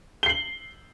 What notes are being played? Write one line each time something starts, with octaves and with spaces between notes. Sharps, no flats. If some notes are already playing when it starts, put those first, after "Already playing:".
C7 F#7 G7